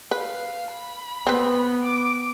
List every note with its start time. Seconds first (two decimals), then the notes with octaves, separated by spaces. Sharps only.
0.11 B4 F5
0.72 B5
1.27 B3 C4 B4
1.83 D6